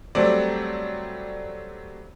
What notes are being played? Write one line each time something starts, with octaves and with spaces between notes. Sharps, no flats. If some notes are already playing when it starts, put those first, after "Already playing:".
F#3 G3 A3 C4 D5